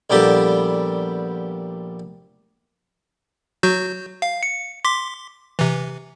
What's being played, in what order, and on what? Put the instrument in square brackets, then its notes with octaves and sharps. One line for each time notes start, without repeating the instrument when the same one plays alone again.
[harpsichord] A#1 A#2 G3 B3 G4 A4
[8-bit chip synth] F#3 F#4 G6
F5
C#7
C6 D6 B6
C3 E3